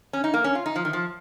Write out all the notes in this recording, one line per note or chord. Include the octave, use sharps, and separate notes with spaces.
C#4
D#4
A#3
C#4
F4
D#4
F3
D#3
F3